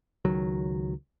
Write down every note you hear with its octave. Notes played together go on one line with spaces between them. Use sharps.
C#2 D#3 F#3